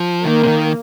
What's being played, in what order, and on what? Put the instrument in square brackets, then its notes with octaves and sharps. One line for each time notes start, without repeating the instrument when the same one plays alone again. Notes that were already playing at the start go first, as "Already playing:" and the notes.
Already playing: [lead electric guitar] F3
[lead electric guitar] D#3 [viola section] A#3
[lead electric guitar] C3
D#3